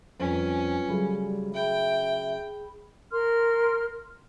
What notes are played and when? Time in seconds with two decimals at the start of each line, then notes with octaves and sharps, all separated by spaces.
0.19 F2 G3 C#4 F4 B4
0.88 C#3 F#3 G3 A3 G#4 B5
1.54 G#4 E5 G5 B5
3.12 A#4 C6 F6